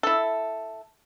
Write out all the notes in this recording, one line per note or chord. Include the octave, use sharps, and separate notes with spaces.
E4 A4